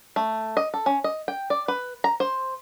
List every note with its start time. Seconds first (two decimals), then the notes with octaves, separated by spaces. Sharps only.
0.16 A3
0.57 D#5
0.74 A4
0.86 C#4
1.04 D#5
1.28 G5
1.50 D5
1.68 B4
2.04 A#5
2.20 C5